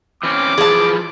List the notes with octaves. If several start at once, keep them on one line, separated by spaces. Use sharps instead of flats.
E3 C4 C#4 D6
E3 F3 G#4 A5